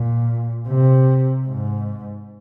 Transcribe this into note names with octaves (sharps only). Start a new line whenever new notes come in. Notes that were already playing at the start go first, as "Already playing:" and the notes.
Already playing: A#2
C3
G#2